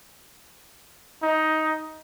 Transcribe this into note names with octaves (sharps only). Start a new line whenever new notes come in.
D#4